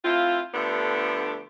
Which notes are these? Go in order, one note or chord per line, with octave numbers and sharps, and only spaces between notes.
A3 C4 E4 F4
D3 F3 A3 B3 D4 G4